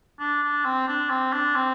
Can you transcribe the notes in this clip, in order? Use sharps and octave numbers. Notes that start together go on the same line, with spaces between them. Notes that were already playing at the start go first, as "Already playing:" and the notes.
D4
D4
C4
D4
C4
D4
C4